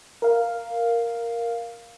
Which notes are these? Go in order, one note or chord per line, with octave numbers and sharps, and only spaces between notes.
A#4 F5